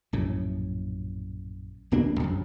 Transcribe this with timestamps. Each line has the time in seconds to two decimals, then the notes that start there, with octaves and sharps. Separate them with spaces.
0.13 A#1 F#2 A2
1.91 D1 B2 A#3 D4
2.20 A#1 F#2